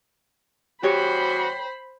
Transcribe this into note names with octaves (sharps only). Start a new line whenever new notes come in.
E2 G3 F#4 G4 C5 C#5 B5